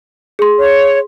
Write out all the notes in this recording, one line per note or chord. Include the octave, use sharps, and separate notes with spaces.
G#4 C6
C#5